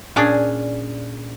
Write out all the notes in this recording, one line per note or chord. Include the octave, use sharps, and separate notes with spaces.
A#2 C#4 D4 G#4